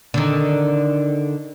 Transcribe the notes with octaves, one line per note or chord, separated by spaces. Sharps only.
D3 D#3